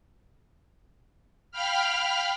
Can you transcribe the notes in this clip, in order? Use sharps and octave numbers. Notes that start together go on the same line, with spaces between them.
F5 G5 B5 F6